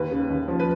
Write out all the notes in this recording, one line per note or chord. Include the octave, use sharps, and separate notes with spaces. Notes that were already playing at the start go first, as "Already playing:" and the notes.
Already playing: D#2 B4
C#3
D#2
F3
B4